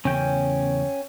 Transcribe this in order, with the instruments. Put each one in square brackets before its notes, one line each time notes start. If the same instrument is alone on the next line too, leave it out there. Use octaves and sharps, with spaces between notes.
[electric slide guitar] E2 C#3 [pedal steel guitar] C#4 G5